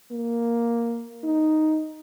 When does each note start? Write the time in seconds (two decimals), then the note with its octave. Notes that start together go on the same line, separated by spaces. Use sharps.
0.11 A#3
1.24 D#4